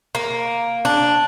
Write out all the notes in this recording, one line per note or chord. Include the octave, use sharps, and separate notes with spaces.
A#3
D4